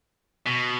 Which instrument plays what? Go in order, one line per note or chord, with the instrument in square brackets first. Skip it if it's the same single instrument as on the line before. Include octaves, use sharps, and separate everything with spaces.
[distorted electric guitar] B2